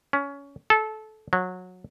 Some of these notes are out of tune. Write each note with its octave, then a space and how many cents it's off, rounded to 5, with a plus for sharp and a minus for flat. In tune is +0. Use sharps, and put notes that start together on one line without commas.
C#4 +20
A4 -20
F#3 -20